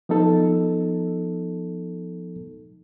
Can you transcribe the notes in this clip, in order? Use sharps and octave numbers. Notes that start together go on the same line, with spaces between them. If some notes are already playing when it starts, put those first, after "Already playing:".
F3 B3 D#4 A4